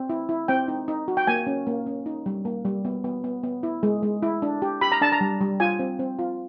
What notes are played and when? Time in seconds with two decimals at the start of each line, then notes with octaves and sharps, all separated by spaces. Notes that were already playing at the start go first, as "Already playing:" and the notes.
Already playing: C4
0.10 E4
0.29 E4
0.48 C4 G5
0.68 D#4
0.88 D#4
1.08 F#4
1.17 G5
1.27 A#3 G#5
1.47 C#4
1.67 A#3
1.86 C#4
2.06 D#4
2.26 G3
2.45 A#3
2.65 G3
2.85 B3
3.04 B3
3.24 B3
3.43 B3
3.63 E4
3.83 G#3
4.03 G#3
4.23 E4
4.42 D4
4.62 G4
4.81 G4 B5
4.92 A#5
5.01 D4 A5
5.12 A#5
5.21 G3
5.41 G3
5.60 F4 G#5
5.79 C4
5.99 C4
6.19 F4